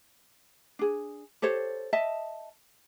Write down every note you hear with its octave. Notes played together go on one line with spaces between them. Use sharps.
D4 G#4
G4 A4 C5 C#5
D#5 E5 A5